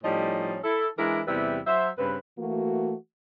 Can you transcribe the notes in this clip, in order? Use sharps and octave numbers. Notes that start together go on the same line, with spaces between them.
A2 F3 G3 C#4 D#4 D#5
E4 A4
E3 G#3 D4 E4 A#4
E2 C3 G3 E4 B4 E5
F#3 C5 E5
G2 C#3 C4 B4
E3 A3 A#3 F#4